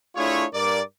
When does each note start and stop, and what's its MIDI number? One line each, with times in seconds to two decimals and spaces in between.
0.15 0.44 57
0.15 0.44 62
0.15 0.44 64
0.15 0.44 65
0.15 0.44 68
0.15 0.44 73
0.53 0.80 43
0.53 0.80 70
0.53 0.80 74